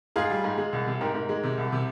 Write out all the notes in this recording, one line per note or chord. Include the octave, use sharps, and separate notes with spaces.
G#2 F4 G#4
G3
G#2
G#3
C2
C3
G#2 G4 A#4
G#2
G#3
C3
C2
C3